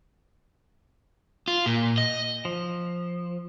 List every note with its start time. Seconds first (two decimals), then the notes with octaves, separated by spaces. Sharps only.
1.48 F4
1.66 A#2
1.98 D#5
2.45 F3